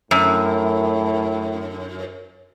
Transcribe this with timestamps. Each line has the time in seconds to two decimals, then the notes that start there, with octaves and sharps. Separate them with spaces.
0.11 F#2 A2